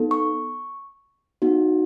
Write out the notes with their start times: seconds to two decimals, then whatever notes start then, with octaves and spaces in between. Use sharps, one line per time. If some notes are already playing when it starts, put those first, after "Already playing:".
Already playing: B3 D#4 A4
0.11 C#6
1.42 B3 D#4 F#4